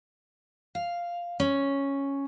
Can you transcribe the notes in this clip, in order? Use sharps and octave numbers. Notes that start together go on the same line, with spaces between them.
F5
C#4